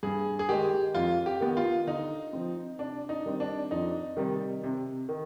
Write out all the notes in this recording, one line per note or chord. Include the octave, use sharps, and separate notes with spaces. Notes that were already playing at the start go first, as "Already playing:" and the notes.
G2 G#4
G#4
D#3 G#3 G4
F2 F4
G4
D#3 B3
F4
D3 D#4
F3 C4
C3 D4
D#4
D#3 G3 C4
D4
F2 D#4
C3 D#3 G3
C3
D#3